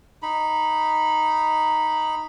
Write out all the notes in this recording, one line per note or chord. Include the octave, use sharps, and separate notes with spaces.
D#4 B5